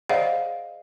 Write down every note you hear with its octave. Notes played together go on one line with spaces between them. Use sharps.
G#4 C5 D5 D#5 F5 F#5